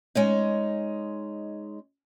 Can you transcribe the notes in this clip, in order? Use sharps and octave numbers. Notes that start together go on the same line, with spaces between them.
G#3 C#4 D#4